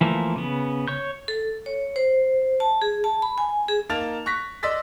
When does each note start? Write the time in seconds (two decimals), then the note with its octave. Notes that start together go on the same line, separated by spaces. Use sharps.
0.01 E3 F3 A3 A#3
0.36 C#3 B3
0.88 C#5 C#6 G6
1.28 A4
1.66 C#5
1.96 C5
2.60 A5
2.82 G#4
3.04 A5
3.22 B5
3.38 G#5
3.68 G#4
3.89 A#3 D#4 A5 F6 A6 F7
4.26 C#6 F#6 A#6 B6
4.63 D5 D#5 C6 E6 A6 B6